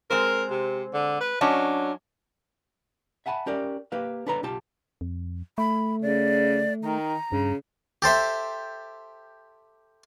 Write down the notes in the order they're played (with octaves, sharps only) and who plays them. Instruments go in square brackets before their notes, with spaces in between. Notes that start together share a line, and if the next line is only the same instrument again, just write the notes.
[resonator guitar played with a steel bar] G#3 C4 C5 [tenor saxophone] A#4
[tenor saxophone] C3
D3
B4
[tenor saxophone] F#3 [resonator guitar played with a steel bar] C#4 D4 D#5
[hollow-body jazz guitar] E5 F#5 G#5 A5 B5
C#4 G4 A#4 D5
A#3 G4 B4 F5
D4 A4 B4 C#5 A#5
B1 F4 G4 A5
[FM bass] F2
[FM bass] A3 [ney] B5
[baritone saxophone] C#3 [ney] D5
[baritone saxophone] D#3 [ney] A#5
[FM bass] G2 [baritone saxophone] C#3
[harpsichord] G4 A4 C5 E5